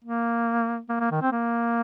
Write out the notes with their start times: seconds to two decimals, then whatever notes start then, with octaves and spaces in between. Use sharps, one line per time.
0.05 A#3
0.89 A#3
1.00 A#3
1.11 D#3
1.22 C4
1.32 A#3